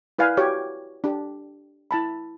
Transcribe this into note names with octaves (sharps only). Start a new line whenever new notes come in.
E4 B4 D5 F5 G#5
F#4 G4 C#5 G5
D4 G4
E4 A5 B5